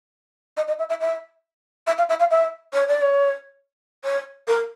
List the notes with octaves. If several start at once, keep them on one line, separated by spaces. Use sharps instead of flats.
D#5
D#5
E5
E5
E5
E5
F5
E5
F5
E5
C#5
D5
C#5
C#5
A#4